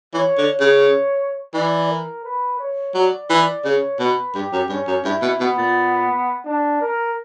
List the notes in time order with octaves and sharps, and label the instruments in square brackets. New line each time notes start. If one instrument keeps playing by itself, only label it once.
[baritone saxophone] E3 [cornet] C#5
[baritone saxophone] D3
[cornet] C#5
[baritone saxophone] C#3
[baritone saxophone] E3 [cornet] D5
[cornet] A#4
B4
C#5
[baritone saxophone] F#3 [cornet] D5
[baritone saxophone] E3 [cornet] D5
[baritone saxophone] C#3 [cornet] C#5
[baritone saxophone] B2 [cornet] B4
[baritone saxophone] G2 [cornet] G4
[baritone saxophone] F#2
[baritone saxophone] G2 [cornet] C#4
[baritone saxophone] F#2
[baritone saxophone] G2 [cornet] E4
[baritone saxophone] B2
[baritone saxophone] B2 [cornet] B3
[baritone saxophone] A#2
[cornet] D4
A#4